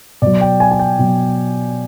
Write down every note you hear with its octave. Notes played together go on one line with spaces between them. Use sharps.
B2 F#3 D5
G5
G#5
G#5
G5
B2 F#3